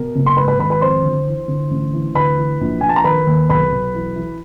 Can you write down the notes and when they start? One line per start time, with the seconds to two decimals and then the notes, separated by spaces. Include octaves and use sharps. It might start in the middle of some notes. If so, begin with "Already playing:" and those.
Already playing: B2 A#4
0.16 F#1
0.26 C6
0.37 G#2 B4 B5
0.48 B4 B5
0.59 G#1 B4 B5
0.70 B4 B5
0.81 F2 C5 C6
1.04 G1
1.27 E3
1.48 G1
1.71 A1
1.93 E3
2.15 D2 B4 B5
2.37 E3
2.61 A#1
2.81 A#1 G#5
2.89 A5
2.96 A#5
3.04 D#3 B4 B5
3.27 D#2
3.49 B1 B4 B5
3.72 B1
3.95 E3
4.16 E3